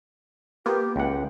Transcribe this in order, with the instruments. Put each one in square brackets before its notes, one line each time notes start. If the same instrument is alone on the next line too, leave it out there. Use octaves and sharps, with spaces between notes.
[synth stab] A#3 B3 F4 [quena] G4
[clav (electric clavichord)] C#2 F#5 [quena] G5